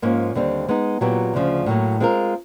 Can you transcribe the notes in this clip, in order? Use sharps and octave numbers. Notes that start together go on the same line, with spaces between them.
G#2 F3 A#3 C#4
D#2 D3 G3 C4
G#3 B3 D#4
A#2 F#3 B3 E4 G4
D2 C#3 F3
A2 F#3 A#3
G#3 C4 F4 A#4